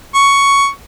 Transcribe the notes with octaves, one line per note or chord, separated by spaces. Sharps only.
C#6